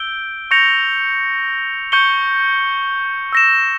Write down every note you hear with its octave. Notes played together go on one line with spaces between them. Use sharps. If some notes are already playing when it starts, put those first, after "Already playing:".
Already playing: E6 G6 D7 G7
C#6 G6 A#6 C#7 F7
C#6 G6 C#7 G7
E6 A#6 E7